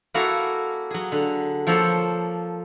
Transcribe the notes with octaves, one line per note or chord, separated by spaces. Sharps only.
A#3 C#4 E4 F#4 A4 F5
F#3 G#4
D3
F3 A#3 A4 C5 C#5